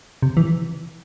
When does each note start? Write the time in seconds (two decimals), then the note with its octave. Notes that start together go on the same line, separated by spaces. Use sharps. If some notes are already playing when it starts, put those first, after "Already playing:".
0.22 C3
0.37 E3